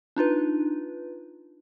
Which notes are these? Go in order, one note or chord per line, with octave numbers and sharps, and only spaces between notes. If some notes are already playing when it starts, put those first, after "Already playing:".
D4 D#4 F4 B4